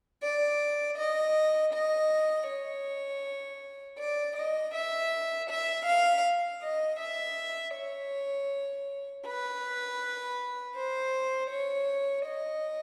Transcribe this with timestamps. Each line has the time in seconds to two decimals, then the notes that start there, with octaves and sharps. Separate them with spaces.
0.22 D5
0.97 D#5
1.73 D#5
2.47 C#5
3.99 D5
4.36 D#5
4.73 E5
5.49 E5
5.86 F5
6.62 D#5
6.98 E5
7.75 C#5
9.25 B4
10.75 C5
11.50 C#5
12.25 D#5